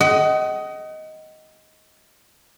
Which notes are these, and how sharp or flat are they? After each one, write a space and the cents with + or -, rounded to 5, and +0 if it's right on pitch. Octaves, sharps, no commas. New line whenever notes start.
D#5 +10 F#5 +40